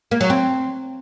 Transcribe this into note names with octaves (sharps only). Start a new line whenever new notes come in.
A#3
F#3
C4